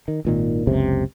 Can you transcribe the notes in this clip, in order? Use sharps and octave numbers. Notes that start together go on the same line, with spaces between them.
D#3
G#1 A#2 D#3
F#1 C#2 C3